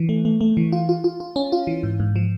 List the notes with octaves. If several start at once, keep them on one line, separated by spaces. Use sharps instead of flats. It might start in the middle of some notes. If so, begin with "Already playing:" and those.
Already playing: E3
A3
A3
A3
E3
F4
F4
F4
F4
C#4
F4
E3
G#2
G#2
F3